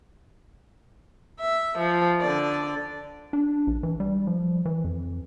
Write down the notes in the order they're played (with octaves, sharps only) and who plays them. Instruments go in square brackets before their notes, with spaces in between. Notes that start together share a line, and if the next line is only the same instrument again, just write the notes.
[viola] E5
F3
D3 D5
[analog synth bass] D4
A#1
E3
G3
F3
E3
F2